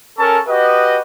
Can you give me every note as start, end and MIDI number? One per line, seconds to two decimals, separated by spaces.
0.18 0.39 61
0.18 0.39 69
0.18 0.39 70
0.18 0.39 81
0.18 0.39 85
0.48 1.00 66
0.48 1.00 67
0.48 1.00 71
0.48 1.00 75